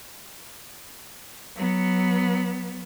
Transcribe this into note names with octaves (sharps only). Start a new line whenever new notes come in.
F#3 B3